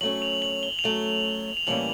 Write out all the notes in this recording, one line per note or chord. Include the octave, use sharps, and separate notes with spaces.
F#3 A3 C#4 F#7
F7
F#7
G7
F7
F#3 A3 C#4 F#7
F7
A2 E3 G3 A#3 C#4 F#7